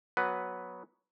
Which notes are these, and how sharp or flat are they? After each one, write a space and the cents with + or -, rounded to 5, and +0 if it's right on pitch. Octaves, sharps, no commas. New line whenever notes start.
F#3 +0 B3 +0 B4 +0